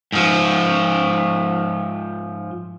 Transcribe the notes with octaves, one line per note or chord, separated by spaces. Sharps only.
G#2 F3